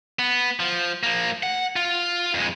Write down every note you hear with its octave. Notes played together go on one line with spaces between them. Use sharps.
B3
F3
F3 A#3
F#5
F4
F2 G#3